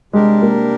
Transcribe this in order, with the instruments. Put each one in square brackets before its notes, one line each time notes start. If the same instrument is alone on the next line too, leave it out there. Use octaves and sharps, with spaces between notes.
[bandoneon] C3 G3 D4 G4 A#4 [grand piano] G#3
[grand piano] A#3